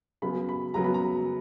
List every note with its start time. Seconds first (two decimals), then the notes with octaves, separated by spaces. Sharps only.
0.22 C#3 F#3 B3 B5
0.49 B5
0.74 C#3 F#3 B3 A#5
0.84 B5
0.94 A#5